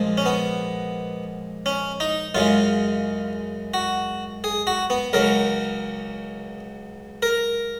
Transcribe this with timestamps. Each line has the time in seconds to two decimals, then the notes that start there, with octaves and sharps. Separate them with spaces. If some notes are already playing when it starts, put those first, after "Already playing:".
Already playing: A#2 F3 G#3
0.18 C#4
0.25 B3
1.66 C#4
2.00 D#4
2.35 F#2 C#3 G#3 F4
3.74 F#4
4.44 G#4
4.67 F#4
4.90 B3
5.13 C#2 C#3 F#3 A#4
7.23 A#4